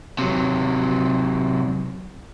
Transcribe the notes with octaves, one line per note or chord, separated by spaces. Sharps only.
C3 F#3